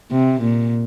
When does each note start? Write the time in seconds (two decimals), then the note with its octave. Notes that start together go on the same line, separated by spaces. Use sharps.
0.12 C3
0.41 A#2